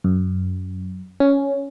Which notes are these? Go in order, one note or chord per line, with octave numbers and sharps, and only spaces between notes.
F#2
C#4